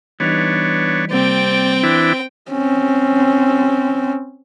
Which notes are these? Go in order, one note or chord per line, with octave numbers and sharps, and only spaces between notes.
E3 G3 B3 D4 D#4 C#5
C3 G3 A#3 C4 D5 G5
E3 D4 E4
C4 C#4